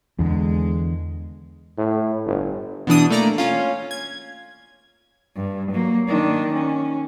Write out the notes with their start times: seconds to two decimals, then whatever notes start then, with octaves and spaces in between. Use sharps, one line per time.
0.19 E2 D3 G#3
1.78 A2
2.26 G1
2.87 B2 E3 D4 D#6
3.10 A3 A#3 D5 A#5 D7
3.38 C#4 F4
3.91 G#6
5.36 G2
5.72 F#3 A#3
6.08 D#3 D4
6.53 C#4